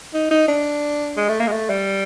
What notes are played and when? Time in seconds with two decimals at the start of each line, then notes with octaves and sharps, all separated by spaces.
0.14 D#4
0.31 D#4
0.48 D4
1.17 G#3
1.29 A3
1.40 A#3
1.47 G#3
1.52 A3
1.70 G3